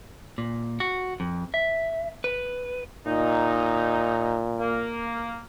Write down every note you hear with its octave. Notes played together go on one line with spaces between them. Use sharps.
A#2
F#4
F2
E5
B4
A#2 D#4
A#3